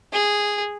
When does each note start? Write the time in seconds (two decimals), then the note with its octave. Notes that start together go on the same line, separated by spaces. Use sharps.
0.13 G#4